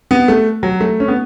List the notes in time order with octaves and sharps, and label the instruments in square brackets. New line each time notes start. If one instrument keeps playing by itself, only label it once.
[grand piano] B3
A3
F#3
A3
C#4
B3